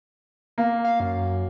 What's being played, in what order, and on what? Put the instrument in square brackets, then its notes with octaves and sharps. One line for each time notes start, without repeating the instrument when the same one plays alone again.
[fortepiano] A#3
[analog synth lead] F5
F#2